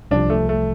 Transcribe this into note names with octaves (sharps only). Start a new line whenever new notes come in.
C2 C3 F3 D4
A3
A3